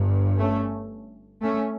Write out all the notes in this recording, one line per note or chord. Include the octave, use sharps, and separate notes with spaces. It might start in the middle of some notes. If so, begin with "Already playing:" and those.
Already playing: G1 G2
A3 C#4
A3 C#4